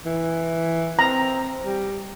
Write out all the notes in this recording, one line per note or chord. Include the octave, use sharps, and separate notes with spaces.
E3
C4 A#5
G3